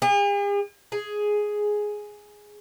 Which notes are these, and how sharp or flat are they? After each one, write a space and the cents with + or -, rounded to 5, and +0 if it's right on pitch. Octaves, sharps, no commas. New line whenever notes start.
G#4 -45
G#4 +5